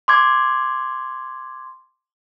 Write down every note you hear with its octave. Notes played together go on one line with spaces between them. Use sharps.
C6 D6 G#6